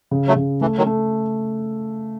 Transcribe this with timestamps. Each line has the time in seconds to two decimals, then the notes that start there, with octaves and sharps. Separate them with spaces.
0.11 C#3
0.28 F#3 A3
0.36 C#3
0.61 E3 A3
0.78 D#3 F#3
0.86 A3